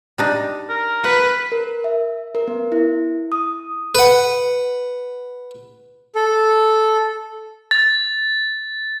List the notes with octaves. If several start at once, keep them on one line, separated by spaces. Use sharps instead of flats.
G3 D4 D#4
A#4
B4 F#5
A#4
E5
A#4
B3
E4
D#6
B4 F#5
A4
A6